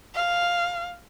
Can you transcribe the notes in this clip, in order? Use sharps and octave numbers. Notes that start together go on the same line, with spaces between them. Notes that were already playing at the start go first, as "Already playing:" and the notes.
F5